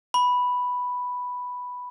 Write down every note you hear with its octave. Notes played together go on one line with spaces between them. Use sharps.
B5